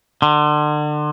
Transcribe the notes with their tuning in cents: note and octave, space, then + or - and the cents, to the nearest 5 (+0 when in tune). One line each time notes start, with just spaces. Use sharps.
D3 +35